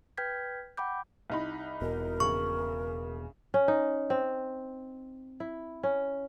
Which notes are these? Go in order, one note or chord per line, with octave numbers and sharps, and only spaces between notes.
B4 G5 F6 G6 G#6 B6
F#5 G5 B5 D6 G6
C2 D#4 B5
E1 B2 A#4
A#1 C#3 C#6
C#4
D#4
C4
E4
C#4